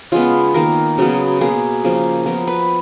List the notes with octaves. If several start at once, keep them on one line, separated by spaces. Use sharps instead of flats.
C#3 G#3 B3 F4
D#3 A#3 A#4
C#3 F#3 B3
B2 A#3 G#4
C#3 F3 A#3
F3 B3 A#4
B4